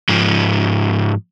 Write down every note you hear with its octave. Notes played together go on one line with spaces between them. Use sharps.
G#2 F3